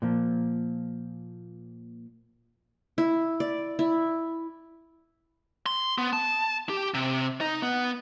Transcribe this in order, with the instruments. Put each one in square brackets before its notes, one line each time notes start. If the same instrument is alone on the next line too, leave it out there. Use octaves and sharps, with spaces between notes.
[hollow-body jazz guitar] A#2 F3
[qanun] E4
D5
E4
[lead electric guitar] C6
B3
A5
G4
C3
D#4
B3